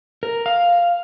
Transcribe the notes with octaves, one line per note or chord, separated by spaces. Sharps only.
A#4
F5